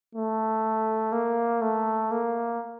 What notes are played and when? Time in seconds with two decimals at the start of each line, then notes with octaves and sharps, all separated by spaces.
0.15 A3
1.12 A#3
1.62 A3
2.11 A#3